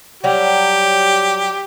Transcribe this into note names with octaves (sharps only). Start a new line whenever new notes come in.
F#3 G3 G4